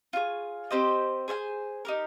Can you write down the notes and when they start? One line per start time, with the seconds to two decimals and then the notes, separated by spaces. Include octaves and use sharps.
0.13 F4 G#4 C#5
0.71 C4 G4 C5 D#5
1.28 G#4 C5 F5 G#5
1.85 D#4 G4 A#4